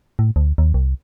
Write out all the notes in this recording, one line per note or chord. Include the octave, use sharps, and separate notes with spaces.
A2
D2
D#2
C2